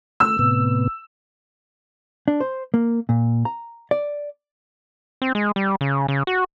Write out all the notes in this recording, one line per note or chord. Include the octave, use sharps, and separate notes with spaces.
A3 E6
A2 C3 B3
D4
C5
A#3
A#2
A#5
D5
C4
G#3
G3
C#3
C#3
F#4